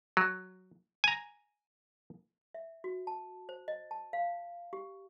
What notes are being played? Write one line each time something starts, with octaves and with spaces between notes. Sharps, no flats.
F#3
G#5 A#5
E5
F#4
A5
C5
D#5
A5
F5
G4